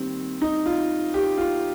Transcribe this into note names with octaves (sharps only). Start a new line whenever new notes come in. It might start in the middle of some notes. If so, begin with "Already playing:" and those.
Already playing: D#3 G3 A#3 C4
D#4
F4
G4
F4